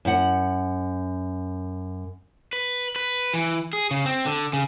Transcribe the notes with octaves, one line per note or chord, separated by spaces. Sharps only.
F#2 F#5
B4
B4
E3
G#4
C#3
C4
D3
C#3